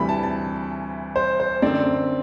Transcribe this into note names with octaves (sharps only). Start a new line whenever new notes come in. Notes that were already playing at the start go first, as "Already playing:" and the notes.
Already playing: D2 C3 E3 G3 B5
A5
A5
C5
C5
F#2 D3 A3 C4 D5